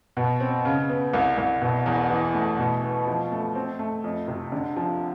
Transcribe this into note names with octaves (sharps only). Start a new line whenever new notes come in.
B2
C4
C#3
B3
C2
C2
B2
E2
E3
A3
B2
B3
F3
A3
C4
A3
F2
C3
D3
F3